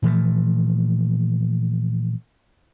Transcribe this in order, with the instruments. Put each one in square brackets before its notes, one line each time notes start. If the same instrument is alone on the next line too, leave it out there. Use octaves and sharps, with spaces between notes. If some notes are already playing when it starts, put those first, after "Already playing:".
[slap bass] A#2 E3 F3 A3